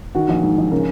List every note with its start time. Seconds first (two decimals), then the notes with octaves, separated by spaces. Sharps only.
0.15 D#3 F#4
0.29 A#1
0.43 G#2
0.58 A#1
0.71 C#3 A#4